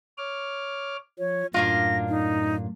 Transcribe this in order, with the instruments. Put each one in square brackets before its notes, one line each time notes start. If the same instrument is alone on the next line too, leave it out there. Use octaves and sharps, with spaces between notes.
[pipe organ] C#5 D6 F6
[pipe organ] F3 [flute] C#5
[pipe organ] F#2 A2 [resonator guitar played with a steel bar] A#3 D4 F4 [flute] A#6
[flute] D#4